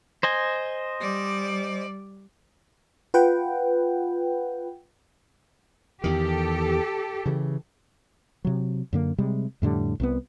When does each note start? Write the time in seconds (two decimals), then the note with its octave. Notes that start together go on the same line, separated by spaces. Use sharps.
0.23 C5 D#5 G#5
1.01 G3 D5
3.14 F4 B4 F#5 G5
6.04 E2 D#3 G4 A4
7.26 C#3 E3
8.45 C3 F#3
8.93 F#2 D3 A#3
9.18 C3 G3 G#3
9.62 F2 A2 D3 G3
10.00 C2 C3 B3